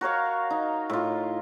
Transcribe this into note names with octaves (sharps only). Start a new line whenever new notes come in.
F#4 A#4 C#5 F5
D#4
A2 F4